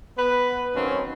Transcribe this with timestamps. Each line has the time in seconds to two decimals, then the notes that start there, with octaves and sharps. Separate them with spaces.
0.18 B3 B4
0.76 D#3 F#3 A#3 C4 C#4